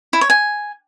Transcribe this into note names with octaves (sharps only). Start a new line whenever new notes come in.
E4
C#5
G#5